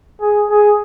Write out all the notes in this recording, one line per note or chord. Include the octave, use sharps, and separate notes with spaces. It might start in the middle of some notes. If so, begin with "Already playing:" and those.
G#4
G#4